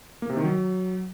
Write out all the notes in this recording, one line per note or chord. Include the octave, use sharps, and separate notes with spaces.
A#3
C3
D#3
F#3